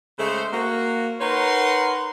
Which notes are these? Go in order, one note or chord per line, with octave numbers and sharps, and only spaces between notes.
C#3 G#3 A3 C5
A#3 F#4
D#4 A#4 B4 C#5 F#5 C6